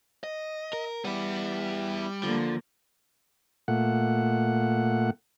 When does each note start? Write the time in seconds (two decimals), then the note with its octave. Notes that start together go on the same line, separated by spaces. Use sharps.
0.24 D#5
0.73 A#4
1.05 G3 B3 E4
2.23 D3 F3 A#3
3.68 A#2 A3 F#5